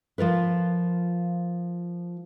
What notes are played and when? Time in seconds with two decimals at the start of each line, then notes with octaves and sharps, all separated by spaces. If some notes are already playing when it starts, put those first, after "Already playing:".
0.18 F3 F4 A#4 B4